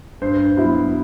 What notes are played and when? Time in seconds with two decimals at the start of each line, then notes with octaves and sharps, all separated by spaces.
0.22 G2 C5
0.57 F#3 B3 E4